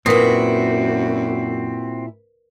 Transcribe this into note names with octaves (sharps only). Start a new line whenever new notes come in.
F#2 A#2 C4 E4 F#4 A#4 B4 D#6